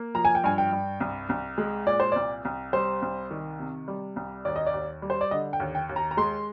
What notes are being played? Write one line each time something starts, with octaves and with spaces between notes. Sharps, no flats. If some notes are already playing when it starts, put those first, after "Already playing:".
Already playing: A#3
F3 A#5
G#5
G5
G2 G#5
G5
G2
C2
C2
G#3
A#2 D5
C5
C2 D5
C2
G3 C5
C2
D#3
C3
G3
C2
D#2 D5
D#5
D5
D#2
G3
C5
D5
D3 D#5
G5
D#2
G5
D#2
A#5
A#5
G#3 C6